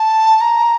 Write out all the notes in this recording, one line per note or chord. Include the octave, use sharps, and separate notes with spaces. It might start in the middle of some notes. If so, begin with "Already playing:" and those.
Already playing: A5
A#5